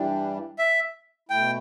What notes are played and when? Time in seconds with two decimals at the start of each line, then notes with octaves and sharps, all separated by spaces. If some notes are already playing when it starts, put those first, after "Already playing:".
Already playing: G2 E3 G3 D4
0.59 E5
1.29 B2 A3 E4 G5